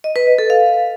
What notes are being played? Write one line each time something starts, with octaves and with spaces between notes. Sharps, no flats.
D#5
B4
D#5
A4
F5